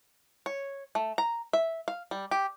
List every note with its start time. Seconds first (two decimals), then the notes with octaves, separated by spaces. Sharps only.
0.46 C#5
0.95 A3
1.18 A#5
1.53 E5
1.88 F5
2.11 G3
2.31 G4